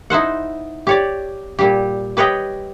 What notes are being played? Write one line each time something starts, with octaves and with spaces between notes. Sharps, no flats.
D#4 E4 C5 F#5
G4 C#5 D5
A#2 G3 G4
G4 B4 C#5 D#5 G5